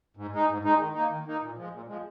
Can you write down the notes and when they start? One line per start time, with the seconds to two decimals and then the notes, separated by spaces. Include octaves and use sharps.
0.17 G#2
0.33 G#3 D#4
0.48 G#2
0.63 G#3 D#4
0.79 D#3
0.94 A#3 D#4
1.09 D#3
1.26 A#3 D#4
1.41 A#2
1.56 F3 G#3
1.72 A#2
1.88 F3 G#3